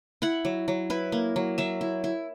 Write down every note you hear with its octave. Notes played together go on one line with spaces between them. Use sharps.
E4 F#5
F#3
F#3
E4 B4
A#3
F#3
F#3 E5
E4
E4